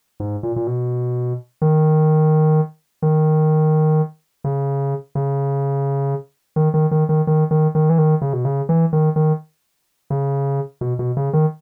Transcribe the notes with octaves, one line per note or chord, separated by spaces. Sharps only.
G#2
A#2
A#2
B2
D#3
D#3
C#3
C#3
D#3
D#3
D#3
D#3
D#3
D#3
D#3
E3
D#3
C#3
B2
C#3
E3
D#3
D#3
C#3
B2
B2
C#3
D#3